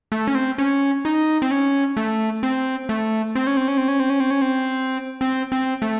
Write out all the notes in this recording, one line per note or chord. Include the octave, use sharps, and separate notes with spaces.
A3
C#4
C4
C#4
D#4
C4
C#4
A3
C4
A3
C4
C#4
C4
C#4
C4
C#4
C4
C#4
C4
C#4
C4
C4
C4
A3